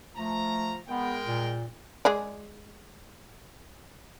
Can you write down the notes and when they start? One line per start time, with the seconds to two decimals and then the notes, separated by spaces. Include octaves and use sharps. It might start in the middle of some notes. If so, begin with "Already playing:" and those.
0.17 F3 A3 A#5
0.89 G#3 B3 A#4 G5
1.27 A#2
2.05 G#3 G#4 D5